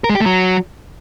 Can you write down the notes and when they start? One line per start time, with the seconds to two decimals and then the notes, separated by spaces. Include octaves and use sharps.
0.04 A#4
0.10 G#3
0.15 G4
0.20 A3
0.26 F#3